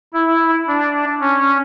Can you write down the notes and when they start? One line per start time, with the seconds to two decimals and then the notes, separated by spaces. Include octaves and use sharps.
0.13 E4
0.67 D4
1.20 C#4